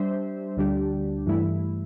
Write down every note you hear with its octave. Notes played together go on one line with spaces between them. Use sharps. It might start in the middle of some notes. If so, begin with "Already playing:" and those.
Already playing: G3 D4 C5 E5
D2 D3 G3 D4 G4
G2 E3 A3 E4